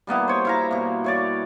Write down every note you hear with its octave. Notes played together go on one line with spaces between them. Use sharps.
G3 A#3 B3 E4
C5 C#5
E4 F5 A#5
B2 A#3
E4 C#5 D5